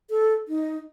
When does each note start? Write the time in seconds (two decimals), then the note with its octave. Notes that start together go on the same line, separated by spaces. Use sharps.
0.10 A4
0.48 D#4